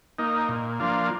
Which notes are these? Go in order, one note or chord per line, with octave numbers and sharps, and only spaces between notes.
A#3 D#4
A#2
F3 A#3 D4 F4